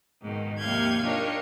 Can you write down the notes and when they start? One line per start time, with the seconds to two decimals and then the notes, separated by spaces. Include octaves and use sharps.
0.22 G#2 B2 D#3
0.59 D#2 C3 F3 F5 G6 G#6
1.03 D4 D#4 F4 G4 A#4 C#5